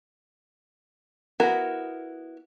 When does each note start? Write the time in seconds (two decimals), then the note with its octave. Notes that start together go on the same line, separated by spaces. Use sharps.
1.40 B3 E4 F#4 A#4